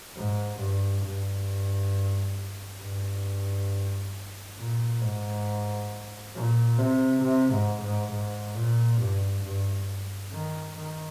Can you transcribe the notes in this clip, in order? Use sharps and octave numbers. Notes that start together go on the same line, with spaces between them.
G#2
G2
G2
G2
A#2
G#2
A#2
C3
C3
G#2
G#2
G#2
A#2
G2
G2
D#3
D#3